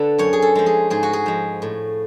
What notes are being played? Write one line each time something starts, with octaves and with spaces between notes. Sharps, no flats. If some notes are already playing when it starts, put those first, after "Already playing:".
Already playing: D3 A4 B4
F#2 C#5
G#4
A4
F3 G#3
G#4
G#2 G#4
F#4
G#4
F3 G#3
A2